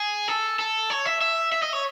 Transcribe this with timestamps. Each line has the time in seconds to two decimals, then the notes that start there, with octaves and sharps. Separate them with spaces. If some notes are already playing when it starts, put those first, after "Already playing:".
Already playing: G#4
0.28 A4
0.59 A4
0.90 C#5
1.06 E5
1.21 E5
1.52 E5
1.63 D#5
1.73 C#5